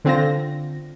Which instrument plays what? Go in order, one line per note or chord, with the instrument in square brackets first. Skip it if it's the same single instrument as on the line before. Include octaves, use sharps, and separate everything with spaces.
[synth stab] D3 C4 F4 A#6